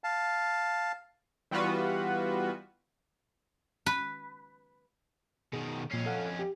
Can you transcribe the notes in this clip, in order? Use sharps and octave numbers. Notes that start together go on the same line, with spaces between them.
F5 A5
E3 G3 B3 F4 F#4 B4
B4
B2 D#3 G#4
F2 A#2 C#4 C7
A4 F5 F#5
G4